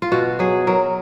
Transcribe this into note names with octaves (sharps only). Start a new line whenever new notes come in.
F4
B2 F#4
F#3 G#4
F#3 A#4